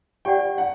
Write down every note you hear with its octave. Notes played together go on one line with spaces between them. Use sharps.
G4 D5 F#5 G5
F#5